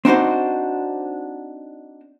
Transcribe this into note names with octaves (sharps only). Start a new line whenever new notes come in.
C4 D4 D#4 F#4 C5